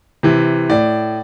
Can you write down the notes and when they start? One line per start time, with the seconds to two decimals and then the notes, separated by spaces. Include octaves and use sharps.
0.23 C3 E3
0.69 A2 D5